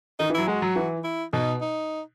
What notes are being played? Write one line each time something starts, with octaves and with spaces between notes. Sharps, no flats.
D#3 D#4
E3
F#3 E4
G#3 F#4
F#3
E3
E4
B2 D#4
D#4